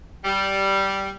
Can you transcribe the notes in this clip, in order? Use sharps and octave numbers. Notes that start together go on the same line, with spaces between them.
G3